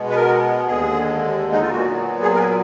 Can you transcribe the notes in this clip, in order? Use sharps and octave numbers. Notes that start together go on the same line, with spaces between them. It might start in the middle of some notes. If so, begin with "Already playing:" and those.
Already playing: B2 G#3 B3
B4
A#4
D#2 D3 G#3 G#4
D#4
F4
A#2 F#3 B3 F#4
G#4
A#4
B4